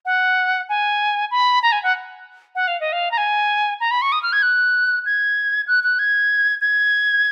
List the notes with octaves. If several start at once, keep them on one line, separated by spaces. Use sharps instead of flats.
F#5
G#5
B5
A#5
G#5
F#5
F#5
F5
D#5
F5
A#5
G#5
A#5
B5
C#6
D#6
F6
G#6
F#6
G#6
F#6
F#6
G#6
G#6